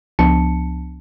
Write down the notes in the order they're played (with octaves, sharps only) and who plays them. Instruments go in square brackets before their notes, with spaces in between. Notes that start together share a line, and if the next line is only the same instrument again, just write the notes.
[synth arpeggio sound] C#2 F3 B3 D4 A5 C#7